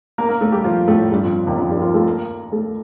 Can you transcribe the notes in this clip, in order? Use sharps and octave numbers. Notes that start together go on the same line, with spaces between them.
A#3 A#4
A#3 A#4
A3 A4
G3 G4
F3 F4
A2 A3
G2 G3
F2 F3
D#2 D#3
F2 F3
G2 G3
F3 F4
A3 A4
A#3 A#4
A3 A4